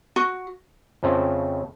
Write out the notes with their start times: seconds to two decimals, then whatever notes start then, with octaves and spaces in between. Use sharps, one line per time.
0.16 F#4
1.03 F2 C#3 F3 A3 C4